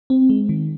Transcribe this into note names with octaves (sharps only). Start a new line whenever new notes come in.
C4
G#3
D#3